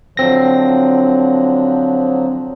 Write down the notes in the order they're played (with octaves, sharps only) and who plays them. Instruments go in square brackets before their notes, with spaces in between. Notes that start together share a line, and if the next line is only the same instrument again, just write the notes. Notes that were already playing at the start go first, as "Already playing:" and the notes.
[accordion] D3 F3 F#3 [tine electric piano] C4 A#6